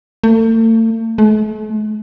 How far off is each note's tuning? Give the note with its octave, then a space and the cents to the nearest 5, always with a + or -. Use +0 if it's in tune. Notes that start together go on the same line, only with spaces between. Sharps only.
A3 +40
A3 -45